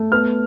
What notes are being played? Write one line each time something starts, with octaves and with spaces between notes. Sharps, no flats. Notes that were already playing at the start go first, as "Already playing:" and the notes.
Already playing: A3
B3 F6